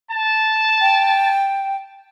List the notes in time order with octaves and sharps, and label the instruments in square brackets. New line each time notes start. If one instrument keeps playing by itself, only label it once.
[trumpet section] A5
[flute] G5